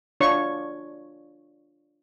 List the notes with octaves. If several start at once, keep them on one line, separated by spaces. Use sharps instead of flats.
D4 F4 C#5 C#6